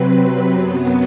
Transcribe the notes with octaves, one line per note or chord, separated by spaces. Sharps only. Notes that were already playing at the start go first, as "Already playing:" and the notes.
Already playing: C3 F#3 C4 B4
F#2 F#3 B3